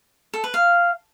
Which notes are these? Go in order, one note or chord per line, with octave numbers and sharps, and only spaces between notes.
A4
B4
F5